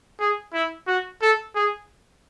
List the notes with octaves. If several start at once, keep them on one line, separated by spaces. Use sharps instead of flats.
G#4
E4
F#4
A4
G#4